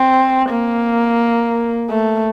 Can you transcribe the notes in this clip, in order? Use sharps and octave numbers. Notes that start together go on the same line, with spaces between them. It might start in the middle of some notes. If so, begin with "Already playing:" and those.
Already playing: C4
A#3
A3